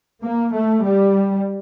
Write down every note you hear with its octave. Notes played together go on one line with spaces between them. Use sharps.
A#3
A3
G3